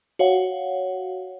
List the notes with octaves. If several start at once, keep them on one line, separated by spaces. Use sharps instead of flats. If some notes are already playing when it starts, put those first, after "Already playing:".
F#4 C#5 F5 F#5